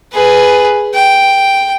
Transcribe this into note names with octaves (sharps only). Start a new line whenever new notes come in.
G#4 B4
G5